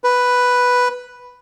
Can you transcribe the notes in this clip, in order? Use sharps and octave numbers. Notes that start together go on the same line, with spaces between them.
B4